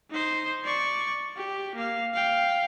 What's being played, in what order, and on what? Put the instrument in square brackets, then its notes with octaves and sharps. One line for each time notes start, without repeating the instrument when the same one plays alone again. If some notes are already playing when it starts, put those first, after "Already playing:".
[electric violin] D#4 C5
D5 C#6
G4
A#3 F5
F5 G5